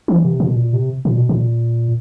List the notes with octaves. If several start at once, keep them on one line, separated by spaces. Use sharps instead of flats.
E3
C3
B2
A#2
C3
A#2
B2
A#2